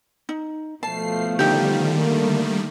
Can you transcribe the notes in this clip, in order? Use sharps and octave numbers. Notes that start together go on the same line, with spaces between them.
D#4
B2 F3 A3 A5 C7
D3 D#3 G3 D#4 G4
A3 A#3